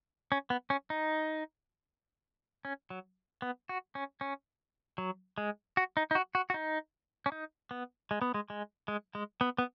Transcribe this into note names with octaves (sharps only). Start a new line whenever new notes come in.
C#4
B3
C#4
D#4
C#4
F#3
B3
F#4
C#4
C#4
F#3
G#3
F#4
D#4
D#4
F#4
F#4
F#4
D#4
C#4
D#4
B3
G#3
B3
G#3
G#3
G#3
G#3
B3
B3